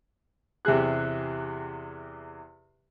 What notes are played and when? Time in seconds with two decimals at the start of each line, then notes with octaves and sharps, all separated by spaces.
0.65 E2 C3 G4 G#4 F#6